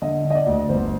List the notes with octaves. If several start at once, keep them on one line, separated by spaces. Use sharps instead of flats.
D3 D#5
D3
D#5
D5
D2
G1 C5